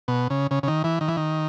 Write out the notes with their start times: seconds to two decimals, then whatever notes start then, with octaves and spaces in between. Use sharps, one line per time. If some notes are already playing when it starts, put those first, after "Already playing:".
0.08 B2
0.30 C#3
0.51 C#3
0.63 C#3
0.68 D#3
0.84 E3
1.01 D#3
1.08 E3
1.17 D#3